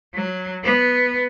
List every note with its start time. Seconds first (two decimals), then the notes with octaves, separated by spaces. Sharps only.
0.14 F#3
0.64 B3